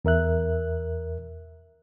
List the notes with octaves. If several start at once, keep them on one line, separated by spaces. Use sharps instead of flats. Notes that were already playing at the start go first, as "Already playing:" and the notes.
E2 A#4 E5 F#6